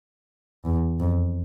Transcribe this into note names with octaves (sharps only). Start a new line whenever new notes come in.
E2
F2